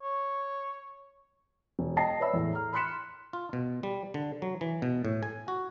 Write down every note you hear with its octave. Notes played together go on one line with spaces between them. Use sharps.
C#5
E1
D#5 G5 A5 A#6 C7
B4 C#5 D5 E5 B5 E6
E2 A2
A#5 F6
B5 C6 F#6 B6 C#7 E7
F4
B2
G3
D3
F#3
E3
B2
A2
G#5
F#4